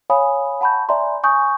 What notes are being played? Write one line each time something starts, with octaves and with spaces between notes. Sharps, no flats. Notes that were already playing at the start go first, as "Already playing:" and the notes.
C#5 F5 G#5 B5 D#6
F#5 A5 B5 C#6 G6
D5 E5 G#5 A#5 C6
G#5 C#6 D#6 G6